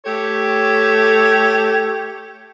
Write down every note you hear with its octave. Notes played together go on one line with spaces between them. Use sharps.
A3 G4 A4 C#5